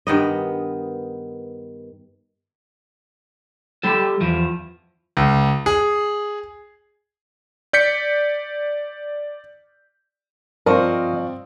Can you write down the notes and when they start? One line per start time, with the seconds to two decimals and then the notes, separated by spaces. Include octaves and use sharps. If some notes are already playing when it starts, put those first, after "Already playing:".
0.07 G2 D#3 B3 D#5
3.83 G3 G4 A4
4.21 E2 F3
5.17 C#2
5.66 G#4
7.73 D5 G6 B6 C#7
10.66 G2 F3 C4 A#4 D5 D#5 F5 C#6